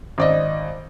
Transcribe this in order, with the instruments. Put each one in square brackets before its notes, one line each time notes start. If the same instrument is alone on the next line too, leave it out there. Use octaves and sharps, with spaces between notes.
[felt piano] G#1 D5 D#5